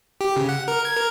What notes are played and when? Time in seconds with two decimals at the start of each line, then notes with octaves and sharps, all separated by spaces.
0.21 G4
0.36 C#3
0.49 F#5
0.68 A#4
0.85 G#6
0.97 A#4